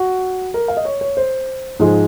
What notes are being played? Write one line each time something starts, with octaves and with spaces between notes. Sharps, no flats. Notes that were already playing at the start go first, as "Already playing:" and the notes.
Already playing: F#4
A#4
F5
D#5
C#5
C#5
C5
G#2 F3 G#3